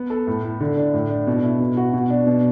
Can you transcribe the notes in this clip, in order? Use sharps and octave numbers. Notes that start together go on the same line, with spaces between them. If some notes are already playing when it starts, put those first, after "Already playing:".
Already playing: B3
A4
A2
E4
D3
D4
A2
D4
B2
E4
B2
F#4
B2
D4
B2